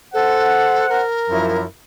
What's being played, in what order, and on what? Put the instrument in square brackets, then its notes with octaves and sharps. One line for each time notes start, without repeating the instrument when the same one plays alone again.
[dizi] A4 [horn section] C5 F#5
[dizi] A#4
[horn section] F#2 F3 E4